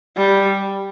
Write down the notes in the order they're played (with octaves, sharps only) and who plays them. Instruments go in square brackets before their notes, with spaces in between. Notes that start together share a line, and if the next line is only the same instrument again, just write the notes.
[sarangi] G3